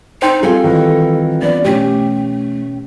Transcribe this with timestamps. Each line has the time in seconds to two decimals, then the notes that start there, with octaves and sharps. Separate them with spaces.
0.22 D#4 C5 G5 C6
0.43 G3 C4 F4 G#4 A4
0.64 D#3 E3
1.42 B3 D4 D5
1.65 B2 A3 C#4 G4